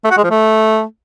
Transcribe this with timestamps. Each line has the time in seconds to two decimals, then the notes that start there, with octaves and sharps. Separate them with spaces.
0.04 A3
0.10 F#4
0.17 G#3
0.23 F3
0.30 A3